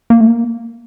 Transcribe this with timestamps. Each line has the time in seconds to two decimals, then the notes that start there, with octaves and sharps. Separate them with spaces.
0.10 A#3
0.21 A3
0.27 A#3